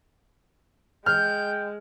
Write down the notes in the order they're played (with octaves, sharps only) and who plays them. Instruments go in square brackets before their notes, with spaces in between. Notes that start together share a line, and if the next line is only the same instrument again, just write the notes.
[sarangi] G#3 [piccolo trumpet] G5 [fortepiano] F6 [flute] G6